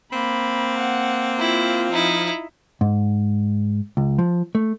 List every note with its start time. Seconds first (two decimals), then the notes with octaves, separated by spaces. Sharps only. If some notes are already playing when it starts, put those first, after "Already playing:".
0.12 A#3 C4 B5
0.78 F#5
1.39 E4 F4
1.91 F3 D#4 E4
2.81 G#2
3.97 C#2
4.19 F3
4.55 A3